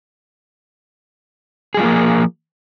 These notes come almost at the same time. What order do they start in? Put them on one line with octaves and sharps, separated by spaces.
G#4 G3 F4 A#3 F3